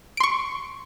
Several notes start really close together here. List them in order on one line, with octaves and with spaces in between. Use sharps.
D7 C6 C#6